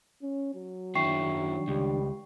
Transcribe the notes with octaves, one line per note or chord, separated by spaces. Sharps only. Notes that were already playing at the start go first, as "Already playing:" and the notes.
C#4
F#3
F#2 D#3 D4 E4 G5 C#6 C7
C#2 G3